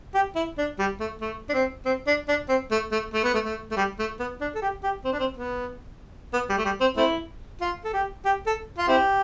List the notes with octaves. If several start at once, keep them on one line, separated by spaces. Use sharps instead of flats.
G4
E4
D4
G3
A3
A3
D4
C4
C4
D4
D4
C4
A3
A3
A3
B3
A3
A3
A3
G3
A3
B3
D4
A4
G4
G4
C4
D4
C4
B3
B3
G3
A3
G3
C4
A3 C4 E4
F4
A4
G4
G4
A4
F4
C4 E4 G4